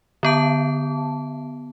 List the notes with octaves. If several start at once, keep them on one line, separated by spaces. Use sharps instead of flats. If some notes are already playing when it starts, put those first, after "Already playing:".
D3 B3 A5